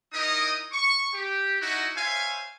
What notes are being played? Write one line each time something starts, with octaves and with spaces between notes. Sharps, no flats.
D#4 E4 A#4 D#5 D#6
C#6
G4
D#4 E4 F#4
C5 C#5 E5 F5 G#5